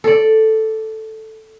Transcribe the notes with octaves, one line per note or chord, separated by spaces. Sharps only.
A4 D5